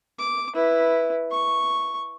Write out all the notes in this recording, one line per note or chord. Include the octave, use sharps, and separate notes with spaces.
D6
E4 B4
C#6